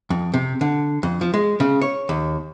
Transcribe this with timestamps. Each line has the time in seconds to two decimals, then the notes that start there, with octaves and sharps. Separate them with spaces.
0.10 F2
0.34 C3
0.61 D3
1.03 F2
1.21 F3
1.34 G#3
1.60 C#3
1.81 C#5
2.09 D#2